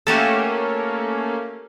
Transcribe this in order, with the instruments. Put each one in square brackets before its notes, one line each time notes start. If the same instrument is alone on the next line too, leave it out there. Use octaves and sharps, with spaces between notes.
[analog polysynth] A3 A#3 C#4 [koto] F#4 G4 A4